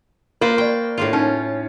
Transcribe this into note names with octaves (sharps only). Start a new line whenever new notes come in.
A#3 F4 B4 C5 D5 F5
D5 G5 C#6
A2 D4 F4
C#4 D#4